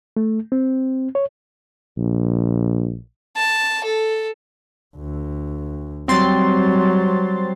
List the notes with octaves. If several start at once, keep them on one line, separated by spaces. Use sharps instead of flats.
A3
C4
C#5
A#1
A5
A4
D2
F#3 G3 C4 C6 A6